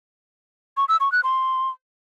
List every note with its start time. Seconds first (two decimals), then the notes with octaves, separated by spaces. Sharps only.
0.77 C#6
0.89 E6
1.00 C#6
1.12 F#6
1.24 C6